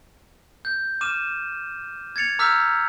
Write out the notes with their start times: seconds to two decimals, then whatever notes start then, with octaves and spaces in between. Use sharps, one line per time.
0.65 G6
1.01 D6 F6 D#7 E7
2.16 G#6 A6 C#7 F7
2.39 A#5 D6 E6 F6 G6 B6